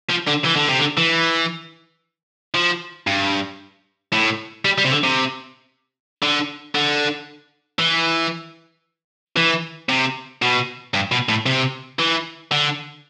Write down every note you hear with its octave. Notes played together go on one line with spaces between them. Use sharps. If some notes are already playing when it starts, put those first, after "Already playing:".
F3
D3
E3
D3
C3
D3
E3
F3
G2
A2
G3
G3
C3
D3
C3
D3
D3
E3
E3
C3
B2
G2
B2
A2
C3
E3
D3